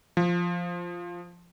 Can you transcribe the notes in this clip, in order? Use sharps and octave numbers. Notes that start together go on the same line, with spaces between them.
F3